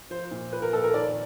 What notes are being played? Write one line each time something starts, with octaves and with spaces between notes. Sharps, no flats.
F3 C5
A#2
F3 B4
A#4
A#2 A4
A#4
D#3 D5